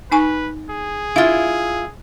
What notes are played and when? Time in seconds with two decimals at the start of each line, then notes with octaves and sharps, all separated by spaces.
0.12 D#4 B4 G#5 C#6
0.71 G#4
1.16 E4 F4 F5